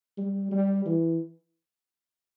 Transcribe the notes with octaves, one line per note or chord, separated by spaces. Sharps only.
G3
G3
E3